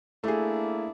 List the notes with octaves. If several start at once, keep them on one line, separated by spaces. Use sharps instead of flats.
A3 A#3 D4 E4 G#4